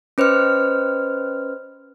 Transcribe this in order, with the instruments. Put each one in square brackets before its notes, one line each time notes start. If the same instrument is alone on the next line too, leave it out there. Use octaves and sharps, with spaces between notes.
[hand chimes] C#4 B4 C5 D#5 F6